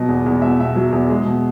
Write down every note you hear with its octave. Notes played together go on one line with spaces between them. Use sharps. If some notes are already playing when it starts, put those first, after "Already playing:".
Already playing: B2 F#3 D#5
E2
E2
B2 E5
B2 E5
F#3
E2
G#3
B2